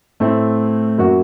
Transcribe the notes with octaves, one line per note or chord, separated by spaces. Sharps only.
A2 A3 C4
F#2 F#3 A#3 F#4